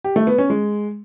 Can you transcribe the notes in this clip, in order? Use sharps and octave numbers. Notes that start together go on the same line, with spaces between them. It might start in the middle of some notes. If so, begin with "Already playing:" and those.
G4
A3
B3
C#4
G#3